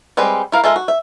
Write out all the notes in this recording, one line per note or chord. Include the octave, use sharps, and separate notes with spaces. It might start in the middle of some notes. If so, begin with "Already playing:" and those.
G3 G#3 C4 B4 G5
E4 A#4 F5
G#3 F4 A4 A#4 E5
F#4
E5